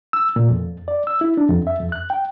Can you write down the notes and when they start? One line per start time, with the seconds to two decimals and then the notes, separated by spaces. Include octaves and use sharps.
0.13 E6
0.36 A#2
0.50 F2
0.88 D5
1.07 E6
1.21 E4
1.37 D4
1.49 F2
1.67 E5
1.79 F2
1.92 F#6
2.10 G5